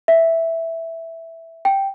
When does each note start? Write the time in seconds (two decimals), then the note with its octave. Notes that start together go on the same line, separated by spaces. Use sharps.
0.08 E5
1.65 G5